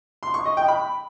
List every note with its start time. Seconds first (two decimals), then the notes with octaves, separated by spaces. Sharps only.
0.23 C6
0.34 C#6
0.46 D#5
0.57 G5
0.68 B5